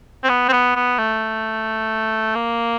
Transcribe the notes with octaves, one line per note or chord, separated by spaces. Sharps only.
C4
B3
C4
B3
B3
A3
A#3